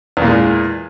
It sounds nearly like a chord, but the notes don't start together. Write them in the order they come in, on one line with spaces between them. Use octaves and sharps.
E2 A#2 G#3